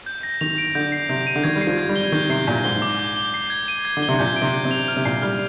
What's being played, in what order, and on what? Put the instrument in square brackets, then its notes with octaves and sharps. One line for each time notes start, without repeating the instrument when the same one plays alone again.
[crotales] G6
A#6
[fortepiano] D#3 [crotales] F7
[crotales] D7
[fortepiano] D3 [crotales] G6
[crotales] C7
[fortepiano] C3 [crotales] G6
[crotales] D#7
[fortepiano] D3
[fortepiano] D#3 [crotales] G#6
[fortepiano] G3
[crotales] C7
[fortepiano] F3
[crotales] G#6
[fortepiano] G3
[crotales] G7
[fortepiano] D#3 [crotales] G6
[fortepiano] C3 [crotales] C7
[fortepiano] A#2 [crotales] G6
[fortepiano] G#2 [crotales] G7
[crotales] D6
G6
G7
C7
G#6
D#7
G#6
[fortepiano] D3
[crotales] G7
[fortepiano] C3
[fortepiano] A#2 [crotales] G6
[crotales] D7
[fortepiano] C3
[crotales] G6
[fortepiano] C3
[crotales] F7
F6
[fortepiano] C3
[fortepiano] A#2 [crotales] C7
[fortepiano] G3 [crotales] F6